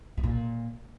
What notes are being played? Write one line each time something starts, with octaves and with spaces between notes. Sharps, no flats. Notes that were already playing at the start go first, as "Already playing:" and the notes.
B2
A#2